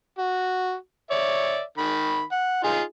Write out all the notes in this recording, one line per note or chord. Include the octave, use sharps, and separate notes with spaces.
F#4
C#5 D5 E5
D#3 B5
F#5
D#4 F4 G#4